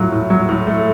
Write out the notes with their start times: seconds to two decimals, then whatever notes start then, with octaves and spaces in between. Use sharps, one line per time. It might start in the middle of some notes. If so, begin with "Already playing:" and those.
Already playing: A2 F#3 A3 F4
0.12 A2
0.30 F#3
0.49 A2
0.67 A3